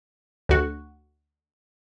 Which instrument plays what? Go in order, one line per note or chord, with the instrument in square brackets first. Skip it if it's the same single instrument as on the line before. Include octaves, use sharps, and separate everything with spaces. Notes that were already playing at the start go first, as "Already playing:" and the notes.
[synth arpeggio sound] D2 F#4